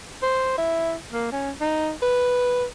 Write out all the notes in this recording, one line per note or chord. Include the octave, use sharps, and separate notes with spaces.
C5
E4
A#3
C#4
D#4
B4